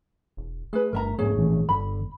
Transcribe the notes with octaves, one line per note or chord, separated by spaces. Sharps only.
E1
A3 G#4 B4
G1 A#4 E5 A#5
C#2 G#2 B3 G#4 C#5
A#1 A#2 E3
G1 D3 B5